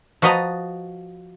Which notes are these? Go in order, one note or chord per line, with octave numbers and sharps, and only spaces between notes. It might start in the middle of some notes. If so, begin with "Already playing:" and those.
F3 F#4 B4 D#5 A5 A#5